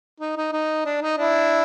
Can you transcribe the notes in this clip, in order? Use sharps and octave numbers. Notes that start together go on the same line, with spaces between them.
D#4
D#4
D#4
D4
D#4
D4 E4